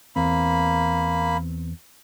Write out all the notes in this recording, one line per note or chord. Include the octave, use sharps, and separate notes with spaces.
E2 A#3 C4 B5